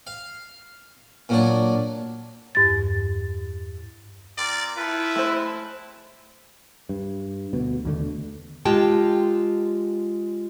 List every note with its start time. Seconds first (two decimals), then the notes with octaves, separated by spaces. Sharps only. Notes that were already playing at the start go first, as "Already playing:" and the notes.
0.07 F5
1.29 A#2 F#3 D4
2.55 E2 G2 A6
4.38 C4 F4 A#4 D5
4.77 E4 F4 A4 B4 G5
5.16 G#3 A3 C4 C5 A5
6.89 G2
7.53 D2 B2
7.85 D#2 D3 A3
8.65 G#3 F4 G4 G5 A5